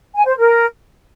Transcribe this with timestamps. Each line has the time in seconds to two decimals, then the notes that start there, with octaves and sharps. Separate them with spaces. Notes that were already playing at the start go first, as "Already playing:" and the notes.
0.15 G#5
0.26 C5
0.37 A#4